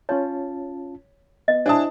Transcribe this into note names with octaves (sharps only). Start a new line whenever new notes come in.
C#4 F4 C#5 A5
B3 D#5
D4 E4 C5 G#5 A5 D#6